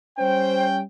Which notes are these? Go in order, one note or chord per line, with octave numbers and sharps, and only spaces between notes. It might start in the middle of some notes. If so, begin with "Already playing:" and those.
G3 C#4 C5 G5